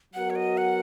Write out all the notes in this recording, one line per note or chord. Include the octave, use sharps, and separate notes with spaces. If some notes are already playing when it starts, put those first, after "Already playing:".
F#3 B3 F#4 A#4 F#5
C#5
D#5
F#5